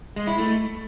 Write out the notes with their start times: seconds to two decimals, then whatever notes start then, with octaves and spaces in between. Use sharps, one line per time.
0.16 G#3
0.27 E4
0.38 A3